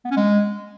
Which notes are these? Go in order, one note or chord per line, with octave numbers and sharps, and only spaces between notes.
B3
C#4
G#3